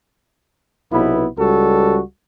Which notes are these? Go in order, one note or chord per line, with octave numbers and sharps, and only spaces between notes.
B1 C3 B3 E4
C#2 G3 F#4 A4